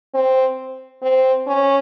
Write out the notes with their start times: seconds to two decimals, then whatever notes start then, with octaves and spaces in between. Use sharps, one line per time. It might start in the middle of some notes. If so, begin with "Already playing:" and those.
0.14 C4
1.03 C4
1.47 C#4